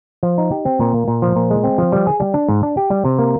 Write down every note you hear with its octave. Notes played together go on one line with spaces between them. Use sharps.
F3
D#4
G4
C4
A#2
A#3
A#2
F3
A#2
G#3
C4
F3
G3
G#4
G3
D4
G#2
D4
G4
G3
C3
A#3